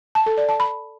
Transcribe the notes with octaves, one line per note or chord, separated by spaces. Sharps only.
A5
A4
D5
A5
B5